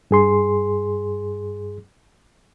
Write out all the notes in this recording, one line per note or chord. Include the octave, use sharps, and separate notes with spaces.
G2 G#4 C6